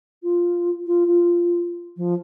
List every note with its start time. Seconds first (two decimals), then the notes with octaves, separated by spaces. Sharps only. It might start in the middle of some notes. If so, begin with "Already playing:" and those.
0.23 F4
0.87 F4
1.07 F4
1.97 F3